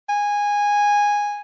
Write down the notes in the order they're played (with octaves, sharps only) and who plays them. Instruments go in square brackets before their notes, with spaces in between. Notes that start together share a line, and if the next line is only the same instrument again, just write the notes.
[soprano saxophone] G#5